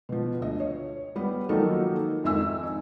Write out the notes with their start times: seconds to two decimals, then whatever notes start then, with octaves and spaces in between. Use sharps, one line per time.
0.09 B2 F3
0.41 D2 D#5
0.60 C#5
1.16 G3 B3 B4
1.49 D#3 F3 F#3 A#3 D#4 A4
2.24 G#1 F2 D#4 E5 G#5 E6